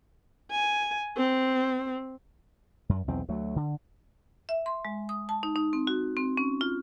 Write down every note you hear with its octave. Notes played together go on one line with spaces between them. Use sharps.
G#5
C4
F#2
B1 E2 C4
D2 F#3 A3
D3
E5
C6
G#3
D#6
A5
D#4
D#4
C4
F#4
C4
C#4
F4